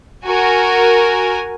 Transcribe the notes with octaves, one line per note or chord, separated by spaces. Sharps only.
F#4 A#4 G#5